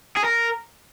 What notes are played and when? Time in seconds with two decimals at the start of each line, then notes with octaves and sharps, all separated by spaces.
0.17 G#4
0.25 A#4